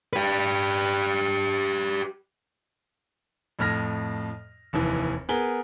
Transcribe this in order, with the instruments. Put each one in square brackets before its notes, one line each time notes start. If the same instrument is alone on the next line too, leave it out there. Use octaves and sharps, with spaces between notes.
[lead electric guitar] G4 B4
[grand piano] F2 A2 F6 A#6
F1 D#2 E3
B3 G#4 A#4 G7